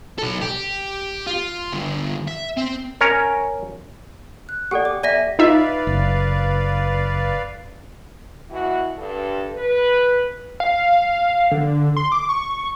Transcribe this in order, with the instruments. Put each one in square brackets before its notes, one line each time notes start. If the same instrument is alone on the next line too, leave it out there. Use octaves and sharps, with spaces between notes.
[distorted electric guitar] B1 A4
G4
F4
G2 D3
E5
C4
[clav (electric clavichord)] C#4 A#4 C#5
[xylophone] F#6
[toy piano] G4 A4 D5 [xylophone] F#5 G5
[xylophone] D6
[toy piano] D5 [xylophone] E5 A#6 D#7
[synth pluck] D#4 F4 E5 [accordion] B4 D5 F5
[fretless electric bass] F#1
[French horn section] B2 E3 E4 F#4
G2 A4
B4
[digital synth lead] F5
D3
C6
D6
C#6